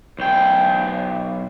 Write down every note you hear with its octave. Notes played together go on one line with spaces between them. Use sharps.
B1 G5